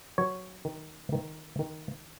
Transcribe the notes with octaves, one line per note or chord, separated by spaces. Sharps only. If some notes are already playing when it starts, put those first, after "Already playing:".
F#3 C#5
D#3
D#3
D#3